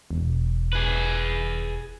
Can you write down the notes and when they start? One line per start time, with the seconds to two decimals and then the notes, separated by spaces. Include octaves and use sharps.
0.11 E1
0.73 G#4 B4